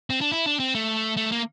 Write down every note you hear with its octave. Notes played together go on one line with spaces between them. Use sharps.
C4
D4
E4
D4
C4
A3
A3
A#3